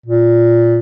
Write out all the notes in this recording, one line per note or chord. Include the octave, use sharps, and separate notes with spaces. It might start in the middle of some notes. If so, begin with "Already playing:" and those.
A#2